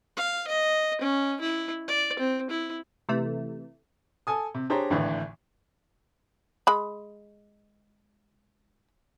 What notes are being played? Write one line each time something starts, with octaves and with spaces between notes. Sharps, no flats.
F5
D#5
C#4
E4
D5
C4
E4
C3 E3 A3
A4 G#5 D#6
C3
D4 G4 G#4 C5 C#5 A#5
G#1 A2 D3 E3
G#3 B5